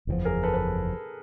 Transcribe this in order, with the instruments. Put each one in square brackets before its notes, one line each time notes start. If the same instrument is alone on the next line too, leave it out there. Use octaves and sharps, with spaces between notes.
[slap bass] F#1 E2 C3 F3
[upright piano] G#4 A#4
A4 B4
B4